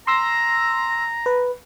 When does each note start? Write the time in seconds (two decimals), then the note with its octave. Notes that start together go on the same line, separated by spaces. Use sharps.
0.07 A#5 C6 E6 A#6
1.26 B4